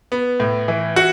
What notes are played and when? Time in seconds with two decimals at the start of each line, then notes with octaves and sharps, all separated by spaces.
0.12 B3
0.40 A2
0.68 E3
0.96 F#4